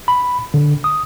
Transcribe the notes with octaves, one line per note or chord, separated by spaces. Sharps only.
B5
D3
D#6